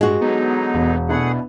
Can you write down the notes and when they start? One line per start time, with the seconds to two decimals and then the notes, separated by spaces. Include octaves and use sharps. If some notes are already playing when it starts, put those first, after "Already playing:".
0.01 G2 G#3 F#4
0.21 D3 F#3 B3 D#4
0.74 E1
1.09 B2 A3 B3 D4 E4 G#4 F#5